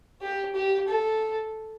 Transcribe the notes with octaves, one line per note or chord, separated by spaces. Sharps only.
G4
G4
A4